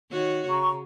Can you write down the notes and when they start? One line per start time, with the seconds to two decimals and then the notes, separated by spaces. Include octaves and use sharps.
0.11 D#3 F#4 C#5
0.49 C#3 A#5 C#6